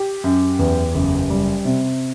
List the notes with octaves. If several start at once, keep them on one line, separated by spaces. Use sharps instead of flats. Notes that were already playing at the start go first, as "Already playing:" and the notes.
Already playing: G4
F#2
E2
F#1
G3
C3